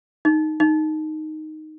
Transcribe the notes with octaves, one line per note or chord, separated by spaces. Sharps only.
D#4
D#4